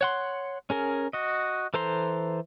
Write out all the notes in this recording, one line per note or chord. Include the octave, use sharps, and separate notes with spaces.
C#5 F#5 C6
C#4 G#4 A#4
F#4 D#5
E3 A4 C5 A#5 C6